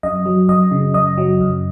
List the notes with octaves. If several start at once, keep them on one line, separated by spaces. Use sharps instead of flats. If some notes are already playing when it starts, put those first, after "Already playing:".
F#2 D#5
F#3
F#2 D#5
C#3
F#2 D#5
F#3
F#2